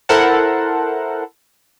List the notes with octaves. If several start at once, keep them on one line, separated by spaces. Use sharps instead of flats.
E4 A4 A#4 C5 F#5 A5